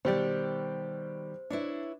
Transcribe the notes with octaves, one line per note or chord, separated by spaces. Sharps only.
B2 D#3 G3 G4 C5 D5
D4 E4 B4 C#5